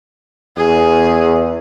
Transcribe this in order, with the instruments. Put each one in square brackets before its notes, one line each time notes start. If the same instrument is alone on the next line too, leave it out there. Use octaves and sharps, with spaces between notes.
[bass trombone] E2 [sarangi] G#4